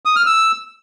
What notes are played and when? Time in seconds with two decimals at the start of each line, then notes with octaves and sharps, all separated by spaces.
0.05 D#6
0.16 F6
0.26 E6